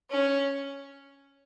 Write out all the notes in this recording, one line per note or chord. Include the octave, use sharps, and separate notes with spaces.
C#4